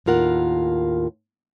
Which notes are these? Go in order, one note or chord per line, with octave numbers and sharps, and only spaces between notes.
D#2 A2 F4 A#4 F#5